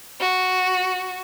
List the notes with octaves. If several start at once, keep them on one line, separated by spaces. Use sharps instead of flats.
F#4